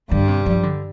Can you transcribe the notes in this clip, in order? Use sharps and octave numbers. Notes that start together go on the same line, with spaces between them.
G2 D3 G3
C3
F3
D3